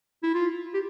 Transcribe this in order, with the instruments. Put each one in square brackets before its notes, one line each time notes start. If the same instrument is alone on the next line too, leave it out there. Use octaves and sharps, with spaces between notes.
[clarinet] E4
F4
G4